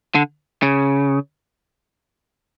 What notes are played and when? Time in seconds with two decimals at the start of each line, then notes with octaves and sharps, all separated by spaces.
0.15 D3
0.63 C#3